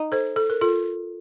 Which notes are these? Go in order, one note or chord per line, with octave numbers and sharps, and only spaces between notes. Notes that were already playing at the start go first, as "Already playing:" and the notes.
Already playing: D#4
A4 C5
A4
A#4
F4 A4